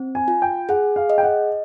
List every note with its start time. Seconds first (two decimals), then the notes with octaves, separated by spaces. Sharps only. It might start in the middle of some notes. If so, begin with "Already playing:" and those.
Already playing: C4
0.15 G#5
0.28 F4
0.42 G5
0.69 G#4 F#5
0.96 F5
1.10 D#5
1.18 G5
1.23 F#5